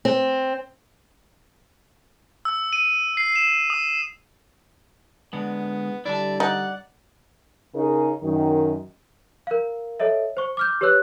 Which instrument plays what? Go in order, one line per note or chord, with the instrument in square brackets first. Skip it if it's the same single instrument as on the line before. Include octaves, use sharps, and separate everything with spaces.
[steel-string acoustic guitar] C4
[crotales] E6
D#7
C7
E7
D#6
[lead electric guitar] D3 G#3 [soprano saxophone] B3
[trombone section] D3 G3 [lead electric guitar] E4 A5 [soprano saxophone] D5
[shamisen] D#4 [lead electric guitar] D5 [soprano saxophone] F#5
[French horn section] C#3 D#4 G#4 A#4
F#2 D#3
[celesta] A#4 F5
A4 C#5 D#5 E5
C5 C#6
D6 F6 G6
G4 B4 C#5 E6 F#6